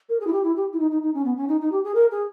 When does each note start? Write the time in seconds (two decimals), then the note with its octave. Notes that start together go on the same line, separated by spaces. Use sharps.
0.09 A#4
0.20 G#4
0.27 E4
0.33 G4
0.44 E4
0.56 G4
0.73 E4
0.79 D#4
0.91 D#4
1.02 D#4
1.14 C#4
1.25 B3
1.37 C#4
1.48 D#4
1.61 D#4
1.72 G4
1.84 G#4
1.95 A#4
2.11 G#4